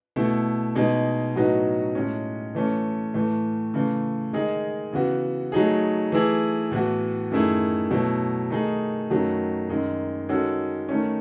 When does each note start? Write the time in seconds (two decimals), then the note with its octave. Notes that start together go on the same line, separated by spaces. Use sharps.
0.16 B2 A3 E4 A4
0.75 B2 G#3 D#4
1.36 A2 F#3 B3 D#4 F#4
1.95 A2 G#3 C#4
2.55 E3 A3 C#4
3.14 A2 E3 A3
3.74 C#3 E3 A3
4.33 D#3 G#3 D#4 G#4
4.93 C#3 E3 B3 F#4
5.52 F#3 A3 D#4 G#4
6.12 E3 A3 E4 G#4
6.71 A2 E3 B3 F#4
7.31 F#2 D#3 A3 E4 G#4
7.90 B2 F#3 A3 E4
8.50 D#3 A3 D#4 G#4
9.10 F#2 D#3 F#3 A3
9.69 F#2 D#3 G#3
10.29 D#3 G#3 C#4 F#4 A4
10.89 D#3 A3 C#4